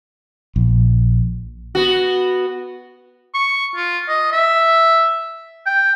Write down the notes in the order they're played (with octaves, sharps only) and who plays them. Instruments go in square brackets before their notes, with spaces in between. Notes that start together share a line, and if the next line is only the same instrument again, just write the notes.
[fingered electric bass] A#1
[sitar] B3 F#4
[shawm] C#6
F4
D#5
E5
G5